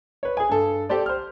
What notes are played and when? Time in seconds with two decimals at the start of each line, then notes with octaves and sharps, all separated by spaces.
0.23 B4 C#5
0.37 G#4 G#5
0.49 G2 A4
0.89 G4 A4 C5 D5
1.06 C5 F6